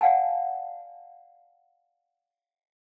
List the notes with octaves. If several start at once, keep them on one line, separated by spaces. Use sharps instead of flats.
D5 F5 F#5 G#5 A5